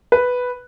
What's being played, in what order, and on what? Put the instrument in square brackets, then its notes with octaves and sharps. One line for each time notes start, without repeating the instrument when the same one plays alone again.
[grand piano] B4